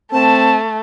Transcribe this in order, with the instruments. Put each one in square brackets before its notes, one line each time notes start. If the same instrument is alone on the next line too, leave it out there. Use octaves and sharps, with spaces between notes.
[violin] A3 [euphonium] C4 [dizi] A5